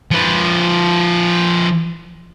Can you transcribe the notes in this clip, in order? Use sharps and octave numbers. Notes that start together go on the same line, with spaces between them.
F3 B4